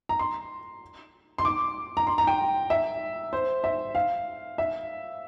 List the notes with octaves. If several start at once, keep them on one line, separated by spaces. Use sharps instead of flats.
A#5
C6
C6
D6
A#5
C6
A#5
G5
E5
C5
E5
F5
E5